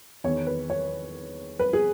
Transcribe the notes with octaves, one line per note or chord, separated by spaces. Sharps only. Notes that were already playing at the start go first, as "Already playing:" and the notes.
E2 D#3 C#5
B4
C#5
B4
G#4